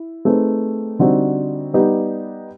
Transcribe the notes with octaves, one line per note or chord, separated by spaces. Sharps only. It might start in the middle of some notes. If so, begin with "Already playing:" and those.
Already playing: E4
A3 C4 D#4 G#4 B4
D3 G3 C4 D#4 F#4
G3 B3 D#4 G4